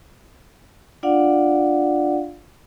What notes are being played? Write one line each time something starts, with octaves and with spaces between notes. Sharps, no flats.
D4 F4 D5 F5 F#5